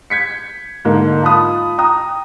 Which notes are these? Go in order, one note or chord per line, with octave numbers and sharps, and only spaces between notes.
G6 G#6 B6 C#7
G#2 D3 A#3
F4 A5 B5 D#6
G5 A#5 D#6